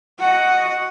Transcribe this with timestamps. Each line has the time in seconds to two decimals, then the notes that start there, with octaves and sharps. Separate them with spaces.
0.19 F#4 D#5 F#5